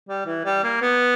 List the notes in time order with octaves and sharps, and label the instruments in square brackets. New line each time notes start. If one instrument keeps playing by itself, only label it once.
[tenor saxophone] G3
E3
G3
A#3
B3